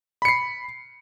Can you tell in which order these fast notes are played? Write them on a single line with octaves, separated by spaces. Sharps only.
B5 C#7 C7